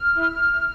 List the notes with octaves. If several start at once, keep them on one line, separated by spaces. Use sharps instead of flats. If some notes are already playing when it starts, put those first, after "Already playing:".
Already playing: F6
E4